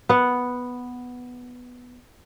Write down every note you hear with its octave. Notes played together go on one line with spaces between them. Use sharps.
B3 F#5